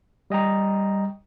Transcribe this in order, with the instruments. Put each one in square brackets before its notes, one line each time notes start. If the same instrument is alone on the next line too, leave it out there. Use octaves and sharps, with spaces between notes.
[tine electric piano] G3 D#5 G5 A#5